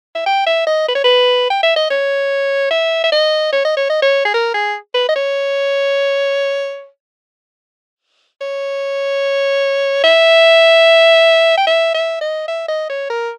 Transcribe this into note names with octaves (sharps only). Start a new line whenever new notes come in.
E5
G5
E5
D#5
B4
C#5
B4
G5
E5
D#5
C#5
E5
E5
D#5
C#5
D#5
C#5
D#5
C#5
G#4
A#4
G#4
B4
D#5
C#5
C#5
E5
G5
E5
E5
D#5
E5
D#5
C#5
A#4